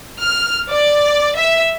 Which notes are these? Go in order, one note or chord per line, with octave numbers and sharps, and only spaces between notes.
F6
D5
E5